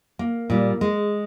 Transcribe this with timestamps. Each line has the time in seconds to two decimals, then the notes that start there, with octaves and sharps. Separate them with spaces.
0.19 A#3
0.50 A#2 G3
0.81 G#3